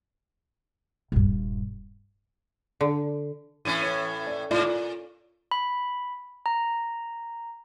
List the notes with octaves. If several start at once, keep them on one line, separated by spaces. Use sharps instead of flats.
D#1 G2
D3
A2 E3 C#4 D#7
C#5
D5
G#2 F4 D5
A#2
B5
A#5